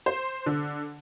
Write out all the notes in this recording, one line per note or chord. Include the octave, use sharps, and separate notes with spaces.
C5
D3